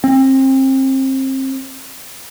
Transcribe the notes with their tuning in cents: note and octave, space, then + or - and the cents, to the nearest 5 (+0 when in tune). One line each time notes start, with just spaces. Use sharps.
C4 +30